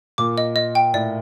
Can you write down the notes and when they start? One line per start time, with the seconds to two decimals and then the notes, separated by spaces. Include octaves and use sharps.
0.18 A#2 D6
0.38 D#5
0.56 D#5
0.75 G5
0.94 A2 D5